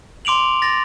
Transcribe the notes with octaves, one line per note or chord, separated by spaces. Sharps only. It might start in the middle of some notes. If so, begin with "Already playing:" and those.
C6 D6 D7 F7 F#7
A6 A#6